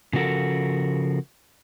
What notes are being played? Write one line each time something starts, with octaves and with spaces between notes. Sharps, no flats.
C#3 F3 A#3 F#4 A4 A#4